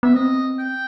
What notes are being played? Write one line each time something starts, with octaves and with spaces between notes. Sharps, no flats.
B3 E5
C4 D#5
G5